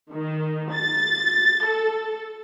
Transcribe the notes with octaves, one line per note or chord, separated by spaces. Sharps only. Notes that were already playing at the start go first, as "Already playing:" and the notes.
D#3
A6
A4